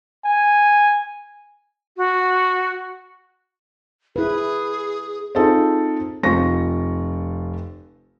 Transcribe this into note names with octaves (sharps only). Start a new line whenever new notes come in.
G#5
F#4
E4 G#4 B4
C4 D#4 F4 G#4 A4
F1 C4 F4 C#6 A#6